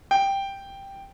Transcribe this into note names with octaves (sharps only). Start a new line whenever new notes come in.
G5